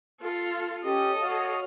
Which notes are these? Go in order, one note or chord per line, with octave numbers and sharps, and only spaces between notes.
F4 A4
C#4 G4 A4 D#5
F#4 C#5 F5